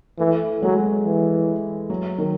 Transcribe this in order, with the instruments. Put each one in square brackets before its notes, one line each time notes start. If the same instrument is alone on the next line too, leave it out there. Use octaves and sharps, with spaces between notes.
[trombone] E3 [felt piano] A3
[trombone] F#3 [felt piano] G#3
[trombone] E3
[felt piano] F#3
D#3